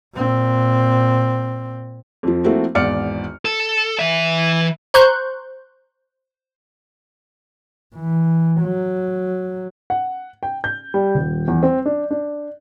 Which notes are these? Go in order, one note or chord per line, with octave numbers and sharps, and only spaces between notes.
A#2 C4
F2 F3
F3 A3 A#3 C4 E4 F#4
G#1 E2 D5 F6 C#7
A4
E3 E5
C5 A#5 C6 C#6 F#6 G6
E3
F#3
F#5
G5
G6
G3
D#1
E2
C4
D4
D4